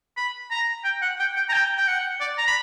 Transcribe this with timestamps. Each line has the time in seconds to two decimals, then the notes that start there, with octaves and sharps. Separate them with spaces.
0.17 B5
0.51 A#5
0.84 G5
1.02 F#5
1.19 G5
1.36 G5
1.49 A#5
1.53 G5
1.77 G5
1.87 F#5
2.20 D5
2.38 A#5
2.47 B5